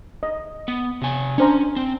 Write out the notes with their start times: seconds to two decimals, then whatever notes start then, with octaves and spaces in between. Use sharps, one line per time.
0.23 D#5
0.68 B3
1.01 C3 G#5
1.38 C#4 D4 C5 A#5
1.76 C4